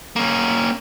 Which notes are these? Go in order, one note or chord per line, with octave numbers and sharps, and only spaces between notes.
A#3 C#4